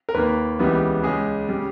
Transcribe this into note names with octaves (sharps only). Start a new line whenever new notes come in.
A#4
D#2 D#3 A#3 B4
C#2 C#3 E3 G3 B3
C#2 C#3 G#3 G#4
C#3 G3